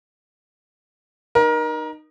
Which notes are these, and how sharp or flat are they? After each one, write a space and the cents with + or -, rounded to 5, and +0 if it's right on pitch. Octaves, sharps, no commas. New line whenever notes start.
D#4 -20 A#4 +25